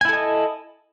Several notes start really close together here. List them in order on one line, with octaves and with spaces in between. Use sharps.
G#5 E4 A4 D#5